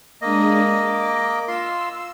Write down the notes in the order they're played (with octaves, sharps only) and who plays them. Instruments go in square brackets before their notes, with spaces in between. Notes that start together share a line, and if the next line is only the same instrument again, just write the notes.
[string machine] G#3 D4 D#6 [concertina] A#3 D#5
[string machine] D6
[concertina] F4 C6 [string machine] E6